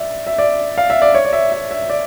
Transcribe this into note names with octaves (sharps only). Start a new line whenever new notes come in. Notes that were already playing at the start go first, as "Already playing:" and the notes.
Already playing: D5 E5
E5
D5
F5
E5
D5
C#5
D5
E5
E5
E5
D5